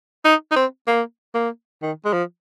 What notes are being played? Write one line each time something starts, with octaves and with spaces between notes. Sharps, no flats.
D#4
D#4
C4
A#3
A#3
D#3
G#3
F3